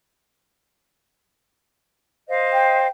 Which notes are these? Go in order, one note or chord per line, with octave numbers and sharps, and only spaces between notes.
C5 D#5 F5
G5